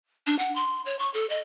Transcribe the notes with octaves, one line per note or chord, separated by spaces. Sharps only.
D4
F#5
C6
C#5
C#6
A4
D#5